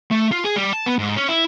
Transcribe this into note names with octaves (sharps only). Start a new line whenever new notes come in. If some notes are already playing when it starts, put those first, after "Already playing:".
A3
F4
G#4
G3
A5
B3
G#2
C#4
E4